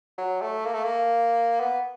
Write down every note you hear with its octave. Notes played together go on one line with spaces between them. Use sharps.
F#3
A3
A#3
A3
A#3
B3